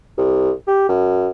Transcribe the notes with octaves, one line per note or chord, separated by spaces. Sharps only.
C2
G4
F#2